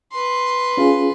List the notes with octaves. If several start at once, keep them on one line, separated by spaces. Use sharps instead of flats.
B4 C6
C#4 F4 G#4